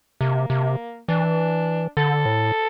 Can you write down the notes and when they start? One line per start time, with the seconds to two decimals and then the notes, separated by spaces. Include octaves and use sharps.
0.21 C3 A#3
0.50 C3
1.09 E3 D4
1.97 D3 A4
2.25 A2